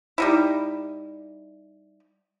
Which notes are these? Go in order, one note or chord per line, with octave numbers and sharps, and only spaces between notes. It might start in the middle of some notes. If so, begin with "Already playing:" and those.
G3 D#4 E4